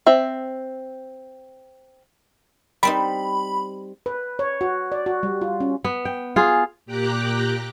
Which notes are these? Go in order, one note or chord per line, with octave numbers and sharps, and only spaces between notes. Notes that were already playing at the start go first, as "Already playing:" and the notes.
C4 E5
G3 C4 D#4 B5
B4
C#5
F#4
D5
F#4
G3
F4
C#4
B3
G5
F4 G#4
A#2 G4 G5 A#5 D6 F#6